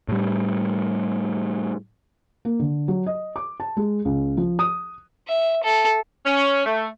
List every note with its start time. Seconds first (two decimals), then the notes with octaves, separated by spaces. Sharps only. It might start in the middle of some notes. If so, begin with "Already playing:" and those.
0.09 A2 G3
2.45 A#3
2.59 D3
2.88 F#3
3.06 D#5
3.36 D6
3.60 A5
3.77 G#3
4.05 C#2
4.37 F3
4.59 D#6
5.28 E5
5.63 A4
6.25 C#4
6.65 A3